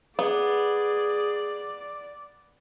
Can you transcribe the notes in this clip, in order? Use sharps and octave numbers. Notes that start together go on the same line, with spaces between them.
B3 G#4 D5